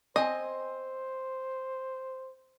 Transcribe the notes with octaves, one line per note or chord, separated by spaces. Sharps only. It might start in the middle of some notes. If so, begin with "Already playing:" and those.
C4 C5 D#5 G#5